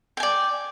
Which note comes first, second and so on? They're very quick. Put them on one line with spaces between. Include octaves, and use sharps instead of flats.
G5 G#5 D5